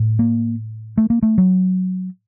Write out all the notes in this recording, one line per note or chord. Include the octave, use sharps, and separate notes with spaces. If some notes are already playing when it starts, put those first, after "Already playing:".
Already playing: A2
A#3
A3
A#3
A3
F#3